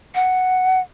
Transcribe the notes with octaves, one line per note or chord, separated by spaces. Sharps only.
F#5